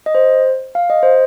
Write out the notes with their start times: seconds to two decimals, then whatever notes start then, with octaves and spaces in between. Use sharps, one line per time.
0.06 D#5
0.15 C5
0.75 F5
0.90 D#5
1.03 C5